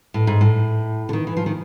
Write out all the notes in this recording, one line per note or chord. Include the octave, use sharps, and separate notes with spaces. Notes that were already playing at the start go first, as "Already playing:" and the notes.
A2
G#2
A2
D3
D#3
E3
F3
D#3